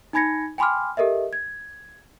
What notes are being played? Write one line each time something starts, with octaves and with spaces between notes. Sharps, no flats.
D#4 G#5 B5 G#6 A#6 C#7
G5 G#5 B5 C6 D6 F6
G4 A4 A#4 D#5 E5
G#6